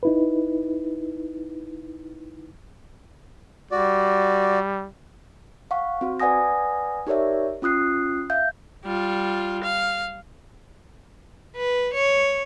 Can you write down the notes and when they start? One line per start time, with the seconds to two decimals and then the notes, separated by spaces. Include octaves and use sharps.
0.03 D#4 E4 B4
3.71 G3 F#4 D5
5.71 F5 F#5 C#6
6.01 C4 F#4
6.20 B4 D5 F#5 G#5 D#6 A#6
7.07 D#4 G4 A#4 C#5 D5 E5
7.62 C#4 F4 D#6 F#6 C7
8.30 E5 F5 G6
8.85 G3 F4
9.63 F5
11.56 B4
11.94 C#5